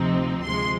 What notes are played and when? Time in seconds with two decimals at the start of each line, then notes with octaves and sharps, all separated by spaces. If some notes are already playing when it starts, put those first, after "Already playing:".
Already playing: D2 C3 F3 C4 D#4
0.44 D2 C3 F3 G#3 C6